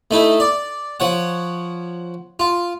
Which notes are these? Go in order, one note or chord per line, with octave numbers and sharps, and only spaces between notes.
A3 D#4 E4
D5
F3 C#5 F#5
F4